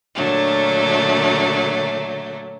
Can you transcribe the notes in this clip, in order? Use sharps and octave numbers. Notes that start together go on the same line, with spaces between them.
A#2 D3 F#3 A3 D4